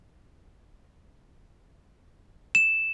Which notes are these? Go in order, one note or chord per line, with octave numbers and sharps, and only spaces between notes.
E7